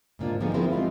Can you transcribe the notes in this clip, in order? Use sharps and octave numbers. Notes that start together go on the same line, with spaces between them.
G#2 D3 A#3 B3 D4 F4
D3 F3 B3 C4 D#4 G#4
F3 C4 E4 G#4 A#4
G3 G#3 F4 F5